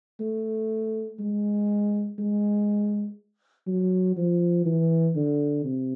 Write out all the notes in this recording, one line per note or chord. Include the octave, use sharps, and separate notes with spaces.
A3
G#3
G#3
F#3
F3
E3
D3
C3